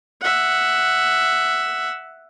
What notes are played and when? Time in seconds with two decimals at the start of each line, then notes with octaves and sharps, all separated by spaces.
0.22 E5 F#5